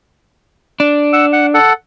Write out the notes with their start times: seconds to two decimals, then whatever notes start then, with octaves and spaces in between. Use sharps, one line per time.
0.80 D4
1.13 F#5 E6
1.33 F#5
1.54 A4 F#5